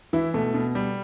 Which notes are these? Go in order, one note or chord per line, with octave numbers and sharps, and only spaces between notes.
E3 E4
B2 A3
B2
G3